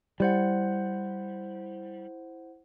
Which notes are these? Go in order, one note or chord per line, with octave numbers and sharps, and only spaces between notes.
G3 E4 C5 F#5